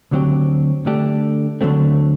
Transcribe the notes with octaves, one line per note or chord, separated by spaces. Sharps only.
D2 D3 F#3 C4 G4
D3 A3 D4 G4
D2 D3 F#3 A3 C4